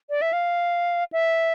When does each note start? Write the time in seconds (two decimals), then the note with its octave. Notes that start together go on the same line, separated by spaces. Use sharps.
0.10 D5
0.22 E5
0.33 F5
1.13 E5